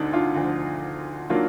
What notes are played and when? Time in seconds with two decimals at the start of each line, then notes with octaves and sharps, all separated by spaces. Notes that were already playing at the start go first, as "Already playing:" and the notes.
Already playing: D2 D3 D4 D#4
0.13 D4 F4
0.36 D2 D3 F3
1.29 D#3 F#3 A#3 D4 F4